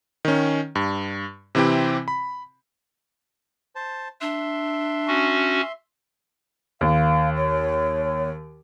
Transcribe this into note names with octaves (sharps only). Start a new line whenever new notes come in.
D#3 C#4
G2
C3 E3 C4 E4 G4
B5
C5 A5
D4 E5 C6
C#4 F#4
D#2 F5
C#5